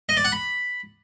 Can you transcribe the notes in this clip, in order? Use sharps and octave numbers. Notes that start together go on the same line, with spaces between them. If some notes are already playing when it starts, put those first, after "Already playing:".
D#5
D5
F#5
B5